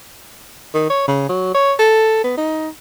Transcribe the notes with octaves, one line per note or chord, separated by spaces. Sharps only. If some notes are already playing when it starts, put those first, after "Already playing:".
D#3
C#5
C#3
F#3
C#5
A4
B3
D#4